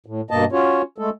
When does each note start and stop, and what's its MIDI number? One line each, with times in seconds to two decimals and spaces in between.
0.06 0.21 45
0.31 0.45 43
0.31 0.45 47
0.31 0.45 58
0.31 0.45 75
0.31 0.45 81
0.52 0.82 61
0.52 0.82 65
0.52 0.82 66
0.52 0.82 73
0.98 1.10 56
0.98 1.10 57
0.98 1.10 69